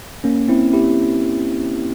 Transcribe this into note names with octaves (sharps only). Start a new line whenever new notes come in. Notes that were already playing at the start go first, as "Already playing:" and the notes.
A#3 C#4
C4 E4
E4 G4